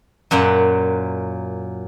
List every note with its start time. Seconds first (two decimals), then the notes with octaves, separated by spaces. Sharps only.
0.31 F#2 A#2 A#3 F#5